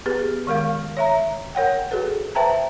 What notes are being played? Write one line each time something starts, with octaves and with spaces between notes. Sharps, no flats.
B3 G4 G#4 B4
D#3 G#3 A#4 F5
C#5 E5 A#5
A#4 C#5 F#5 G5
F#4 G#4 A4 B4
B4 C5 E5 G5 A5 A#5